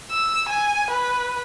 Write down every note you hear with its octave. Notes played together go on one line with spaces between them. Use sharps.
E6
G#5
B4